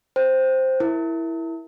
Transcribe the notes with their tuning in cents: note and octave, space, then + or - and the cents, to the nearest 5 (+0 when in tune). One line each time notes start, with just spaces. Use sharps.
C5 +0 G5 +0
E4 +0 A#4 +0